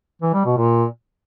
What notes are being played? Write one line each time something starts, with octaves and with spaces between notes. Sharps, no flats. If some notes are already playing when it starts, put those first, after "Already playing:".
E3
G3
B2
A#2